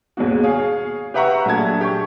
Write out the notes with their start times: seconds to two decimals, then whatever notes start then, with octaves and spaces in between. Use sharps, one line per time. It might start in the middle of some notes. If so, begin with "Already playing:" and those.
0.17 D#2 G#2 B2 F#4
0.44 G#4 C#5 F5
1.14 G4 B4 E5 F#5 A#5 C#6
1.45 A#1 F#3 A3 A5 G#6
1.81 G4 C#6